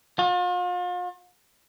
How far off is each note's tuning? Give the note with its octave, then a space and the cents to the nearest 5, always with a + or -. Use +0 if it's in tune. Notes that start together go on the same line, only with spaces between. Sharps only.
F4 +40